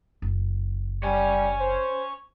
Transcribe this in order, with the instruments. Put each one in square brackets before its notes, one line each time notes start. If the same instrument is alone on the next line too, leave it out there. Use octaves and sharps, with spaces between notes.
[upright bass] F#1
[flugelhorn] G3 [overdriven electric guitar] C#5 G#5
[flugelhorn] C5